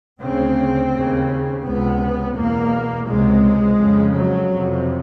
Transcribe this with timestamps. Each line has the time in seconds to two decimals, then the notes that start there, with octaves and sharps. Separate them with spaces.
0.21 D2 C#3 C4
0.93 D#2 C#3
1.65 C#2 C3 B3
2.36 E2 B2 A#3
3.08 C#2 C3 G#3
3.80 F2 C#3
4.16 F#3
4.52 F2 C3